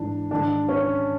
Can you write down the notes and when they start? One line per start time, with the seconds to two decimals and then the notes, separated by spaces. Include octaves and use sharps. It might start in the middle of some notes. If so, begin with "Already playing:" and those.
Already playing: G#2 E3 D4
0.31 G#2 D#3 D4
0.69 C#4